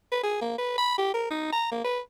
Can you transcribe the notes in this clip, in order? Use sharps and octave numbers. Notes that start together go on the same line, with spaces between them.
B4
G#4
A#3
B4
B5
G4
A#4
D#4
A#5
A#3
B4